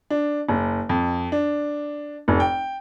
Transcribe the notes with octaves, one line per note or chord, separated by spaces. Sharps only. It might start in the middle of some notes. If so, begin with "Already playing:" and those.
D4
F#1
F2
D4
F1
G5